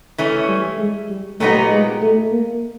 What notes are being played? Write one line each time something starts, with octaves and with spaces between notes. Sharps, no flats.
E3 A3 C#4
G3
G#3
G3
A#2 F#3 A3 B3 D#4 G4
G#3
A3
A#3